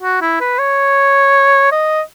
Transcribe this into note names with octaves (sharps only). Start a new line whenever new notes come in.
F#4
E4
B4
C#5
D#5